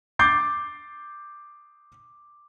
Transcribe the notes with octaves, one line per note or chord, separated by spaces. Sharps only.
D6 G6 A6 C7